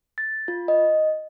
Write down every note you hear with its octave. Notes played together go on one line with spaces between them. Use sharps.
A6
F4
D#5